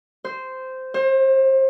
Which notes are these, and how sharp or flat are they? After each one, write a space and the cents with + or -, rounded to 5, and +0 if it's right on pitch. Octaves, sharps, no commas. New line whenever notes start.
C5 -10
C5 +30